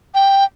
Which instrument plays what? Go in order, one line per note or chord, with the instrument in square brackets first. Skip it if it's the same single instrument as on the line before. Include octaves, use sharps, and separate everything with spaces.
[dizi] G5